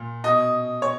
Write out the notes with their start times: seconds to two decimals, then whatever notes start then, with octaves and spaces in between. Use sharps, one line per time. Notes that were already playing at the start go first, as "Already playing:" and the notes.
Already playing: A#2
0.24 B2 D#5
0.82 C#5